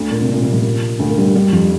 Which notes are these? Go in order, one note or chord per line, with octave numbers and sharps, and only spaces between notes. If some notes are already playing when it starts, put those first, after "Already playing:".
Already playing: D2 D3
A#2
C3
A#2
C3
A#1 A#2
D2 D3
A#3
G2 G3
G2 G3
F2 F3